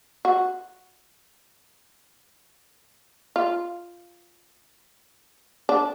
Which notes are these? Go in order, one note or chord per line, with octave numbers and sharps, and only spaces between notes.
F#4
F4
D4